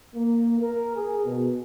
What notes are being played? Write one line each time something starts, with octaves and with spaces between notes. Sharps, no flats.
A#3
A#4
G#4
B2